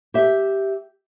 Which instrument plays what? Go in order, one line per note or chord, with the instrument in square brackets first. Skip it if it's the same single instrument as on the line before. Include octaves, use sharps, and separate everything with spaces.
[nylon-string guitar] G4 E5